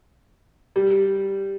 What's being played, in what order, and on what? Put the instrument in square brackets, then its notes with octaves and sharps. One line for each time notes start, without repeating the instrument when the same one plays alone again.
[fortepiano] G3